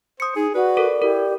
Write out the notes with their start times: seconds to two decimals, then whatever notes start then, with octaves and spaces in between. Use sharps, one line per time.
0.20 C5 D#6 C#7
0.36 D#4 G#4
0.54 F#4 B4 D5
0.77 A4 A#4
1.02 E4 G4 A#4